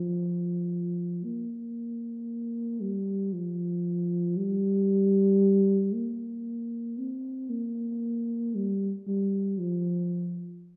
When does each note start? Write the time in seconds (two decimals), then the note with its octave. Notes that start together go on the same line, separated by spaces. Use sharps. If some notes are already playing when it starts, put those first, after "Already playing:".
Already playing: F3
1.24 A#3
2.81 G3
3.33 F3
4.37 G3
5.94 A#3
6.98 C4
7.50 A#3
8.55 G3
9.07 G3
9.58 F3